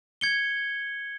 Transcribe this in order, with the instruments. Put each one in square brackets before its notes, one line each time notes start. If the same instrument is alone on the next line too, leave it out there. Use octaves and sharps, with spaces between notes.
[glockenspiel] G#6 C#7 G7